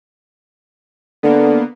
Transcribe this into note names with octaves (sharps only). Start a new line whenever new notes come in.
D3 A#3 B3